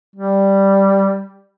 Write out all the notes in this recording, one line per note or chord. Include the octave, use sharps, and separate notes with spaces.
G3